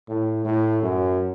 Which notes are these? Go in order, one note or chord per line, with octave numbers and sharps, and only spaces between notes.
A2
A2
F#2